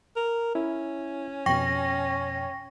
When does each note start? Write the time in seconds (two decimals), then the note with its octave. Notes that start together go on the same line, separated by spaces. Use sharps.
0.16 A#4
0.55 C#4 E4
1.46 F2 B2 G5 C#6 A#6